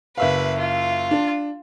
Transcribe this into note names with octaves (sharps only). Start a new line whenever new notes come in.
F#1 B4 E5 F5
F4
D4